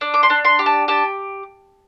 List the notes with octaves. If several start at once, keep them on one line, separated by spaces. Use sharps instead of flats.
D4
D6
C6
D4
C6
G4
A5
G4 A5